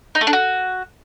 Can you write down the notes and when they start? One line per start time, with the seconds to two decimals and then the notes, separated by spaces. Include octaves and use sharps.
0.15 D#4
0.21 A3
0.27 D4
0.33 F#4